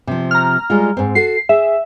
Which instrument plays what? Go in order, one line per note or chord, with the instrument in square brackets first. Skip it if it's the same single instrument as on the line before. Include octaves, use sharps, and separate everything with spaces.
[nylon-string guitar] C3 F3
[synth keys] A#5 F6
[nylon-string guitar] G3 G#3 F4
G#2 C4
[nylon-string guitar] F#4 A4 [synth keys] C7
[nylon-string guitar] G#4 [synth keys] E5